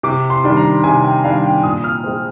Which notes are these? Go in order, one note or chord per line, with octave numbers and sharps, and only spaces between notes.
C3 D6
C6
D#3 G3 D4
A#5
C3 G#5
G5
D#3 G3 D4 F5
G5
A#2 D#6
F6
G#3 C4